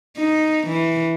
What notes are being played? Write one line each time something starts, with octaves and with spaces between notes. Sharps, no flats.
D#4
E3